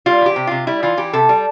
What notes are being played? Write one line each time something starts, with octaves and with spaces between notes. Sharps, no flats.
G3 F4
E3 G4
C3
C3 F4
G3 E4
E3 F4
E3 G4
C3 A4
G3